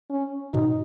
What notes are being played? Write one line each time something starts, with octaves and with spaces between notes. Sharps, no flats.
C#4
G#2 B2 D#4